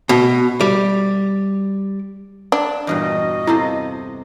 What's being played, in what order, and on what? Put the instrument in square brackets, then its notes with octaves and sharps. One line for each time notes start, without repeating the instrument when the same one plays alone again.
[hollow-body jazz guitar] B2
G3
[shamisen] D4
[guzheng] E2 G2 A#2 [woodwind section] F4 F#4 D#5
[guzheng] C3 A4 C5 [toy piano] E4